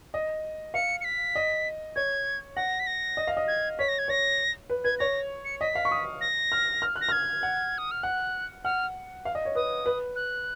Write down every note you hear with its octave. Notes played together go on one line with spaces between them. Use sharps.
D#5
F5 C#7
C#7
B6
D#5
C#5 G#6
F#5 A#6
B6
A#6
D#5
F5
D#5
G#6
C#5 B6
A#6
G#6
C#5 A#6
B4
B4 G#6
C#5 A#6
C#7
D#5 B6
F5
C#6
D#6
A#6
F6
F6
F#6
A#6
F6 G#6
F#5
D#6
F6
F#5 F#6
F#5 F6
F5
D#5
C#5
B4 D#6
B4
F#6